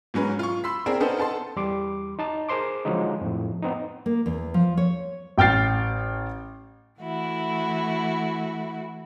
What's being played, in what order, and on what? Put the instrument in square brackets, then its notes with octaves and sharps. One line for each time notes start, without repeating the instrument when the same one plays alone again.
[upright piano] G#2 F#3 C#4 B4
F4 C#6
B5 C6 E6 B6
C4 G#4 A#4 D5
B3 C#4 D#4 A4 A#4 C5
B3 A4 A5 C6
[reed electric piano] E2 G3 C6 D6
D#4 A5
G#4 A#4 C5 C6 D6
D3 F3 F#3 G#3 D#4
F2 A2
B3 C4 D#4
[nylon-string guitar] A#3
E2
F3
C#5
[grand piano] A1 G5 F6 A6 C7
[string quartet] E3 A3 E4 F#4